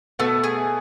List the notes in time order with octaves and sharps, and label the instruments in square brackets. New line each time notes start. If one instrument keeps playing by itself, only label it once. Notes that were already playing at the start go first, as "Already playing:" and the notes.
[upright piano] B2 B3 [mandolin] A3
[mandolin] G#4